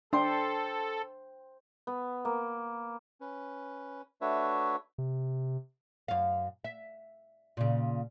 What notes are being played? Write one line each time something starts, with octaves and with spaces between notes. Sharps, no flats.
D4 A4 C5 G5 C6
B3
A#3
C#4 B4
A3 D4 F#4 B4 C#5 E5
C3
F#2 F5
E5
A#2 C#3